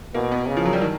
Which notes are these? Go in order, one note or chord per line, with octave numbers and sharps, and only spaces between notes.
B2 A#3
B3
C#3
F3
F#3
G3
D#3